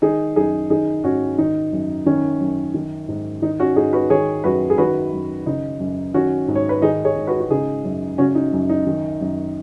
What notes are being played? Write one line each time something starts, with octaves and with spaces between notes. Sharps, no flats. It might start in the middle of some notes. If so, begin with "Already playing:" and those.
D#3 D#4 G#4
F#2 D#4 G#4
D#3 D#4 G#4
G#2 C#4 F#4
D#3 D#4
F#2
D#3 C#4
F#2
D#3
G#2
D#3 D#4
C#4 F#4
G#2 D#4 G#4
F#4 B4
D#3 G#4 C#5
F#2 F#4 B4
G#4
D#3 F#4 B4
F#2
C#3 D#4
F#2
D#3 C#4 F#4
G#2
C#5
B4
D#3 D#4 G#4
G#4 C#5
G#2
F#4 B4
F#4
C#3 D#4 G#4
F#2
C#3 C#4 F#4
D#4
F#2
D#4
D#3
F#2